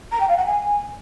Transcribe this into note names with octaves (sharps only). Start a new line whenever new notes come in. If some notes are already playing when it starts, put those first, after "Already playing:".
A#5
G5
F5
F#5
G#5